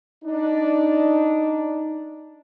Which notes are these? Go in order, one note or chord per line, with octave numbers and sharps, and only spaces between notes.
D4 D#4